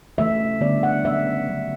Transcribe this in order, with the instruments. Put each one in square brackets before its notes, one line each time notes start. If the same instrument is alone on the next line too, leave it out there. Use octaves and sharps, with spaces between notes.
[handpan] C#3 E3 A3 E5
D3 G3 B3 D5
F#5
C#3 F#3 B3 E5
C#3 F#3 B3